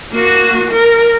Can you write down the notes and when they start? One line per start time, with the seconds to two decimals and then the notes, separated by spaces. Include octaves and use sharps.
0.12 A#3 F#4
0.72 A#4